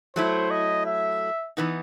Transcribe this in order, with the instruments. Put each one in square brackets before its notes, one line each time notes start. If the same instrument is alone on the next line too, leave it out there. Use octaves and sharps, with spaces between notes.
[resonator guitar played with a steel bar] F#3 A3 E4 [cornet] C5
[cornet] D#5
E5
[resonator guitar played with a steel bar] C3 E3 B3 D#4